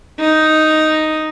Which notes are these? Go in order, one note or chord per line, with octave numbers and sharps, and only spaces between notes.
D#4